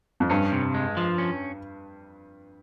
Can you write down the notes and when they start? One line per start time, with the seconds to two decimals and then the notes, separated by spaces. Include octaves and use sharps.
0.20 F2
0.30 G2 C#4
0.52 C3
0.74 G#3
0.97 F3
1.18 C#4